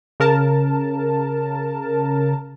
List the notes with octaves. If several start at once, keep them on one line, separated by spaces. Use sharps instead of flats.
C#3 A#4 A5